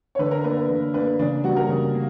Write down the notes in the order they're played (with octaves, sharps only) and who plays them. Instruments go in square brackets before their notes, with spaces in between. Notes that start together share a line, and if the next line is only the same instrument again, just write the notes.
[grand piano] C#5
D3 B4
A#4
A#3 D4 B4
B4
D3
A#3 D4 B4
C#3 D4 D5
G3 A#3 F#4 F#5
A#4
C#3
A#3